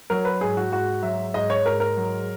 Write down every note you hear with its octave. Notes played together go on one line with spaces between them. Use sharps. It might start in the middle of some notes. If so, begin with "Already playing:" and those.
F#3 A#4
B4
G#2 G#4
F#4
G#2 F#4
F#3 E5
G#2 D#5
C#5
G#2 A#4
A#4
F#3